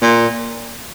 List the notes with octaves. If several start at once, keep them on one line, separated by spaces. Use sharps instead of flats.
A#2